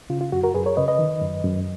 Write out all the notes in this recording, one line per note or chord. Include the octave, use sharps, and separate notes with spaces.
C#3 F4
F4
F#2 F#4
F#4 A#4
F#2 G#4 B4
A#4 C#5
C#3 B4 D#5
B4 D#5
D#3
F#2
F#2